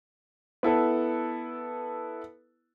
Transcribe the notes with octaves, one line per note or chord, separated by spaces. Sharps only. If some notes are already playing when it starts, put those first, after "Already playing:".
B3 E4 A4 B4